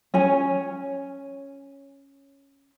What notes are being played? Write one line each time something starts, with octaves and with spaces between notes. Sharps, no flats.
C#4 C#5 G#5